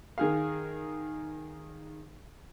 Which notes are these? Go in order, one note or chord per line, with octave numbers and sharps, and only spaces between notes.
D#3 G#4 F5